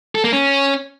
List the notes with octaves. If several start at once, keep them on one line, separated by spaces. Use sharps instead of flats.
A4
A#3
C#4